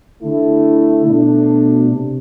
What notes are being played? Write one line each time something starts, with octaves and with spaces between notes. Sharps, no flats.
D3 A3 E4
B2 A3 D4
C3